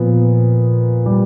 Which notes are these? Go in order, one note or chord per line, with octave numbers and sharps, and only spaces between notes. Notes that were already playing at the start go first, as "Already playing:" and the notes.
Already playing: A#2 F3 B3
G3